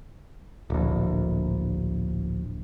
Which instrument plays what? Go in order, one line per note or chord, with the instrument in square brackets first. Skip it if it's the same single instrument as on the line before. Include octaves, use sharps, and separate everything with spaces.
[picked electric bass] D1 A#1